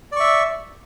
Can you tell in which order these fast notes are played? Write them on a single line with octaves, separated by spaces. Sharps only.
D5 C#6 E5